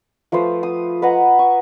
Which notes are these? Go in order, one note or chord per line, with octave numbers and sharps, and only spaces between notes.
F3 A3 B4 C5
D#6
B4 D#5 F#5 A#5
C#6